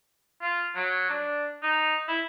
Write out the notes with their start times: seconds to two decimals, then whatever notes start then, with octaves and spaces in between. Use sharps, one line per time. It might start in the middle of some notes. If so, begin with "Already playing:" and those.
0.42 F4
0.75 F#3
1.09 D4
1.63 D#4
2.08 E4